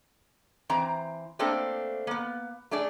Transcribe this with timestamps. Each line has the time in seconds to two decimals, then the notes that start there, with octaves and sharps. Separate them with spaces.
0.69 E3 C4 A#5
1.39 A3 A#3 C4 D4 A4
2.07 A#3 B3
2.71 A3 D4 G#4 D5